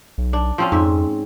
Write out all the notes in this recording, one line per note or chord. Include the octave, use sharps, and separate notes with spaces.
B1
D4
F3 C4 C#4 F4
F2 G#2 E5